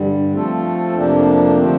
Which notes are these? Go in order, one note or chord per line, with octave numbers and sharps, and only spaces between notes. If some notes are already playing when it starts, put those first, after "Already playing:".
Already playing: G2 D3 G3
F3 A3 C4 F4 A4
F2 C3 F3 A#3 D4
D3 F3 A3 C4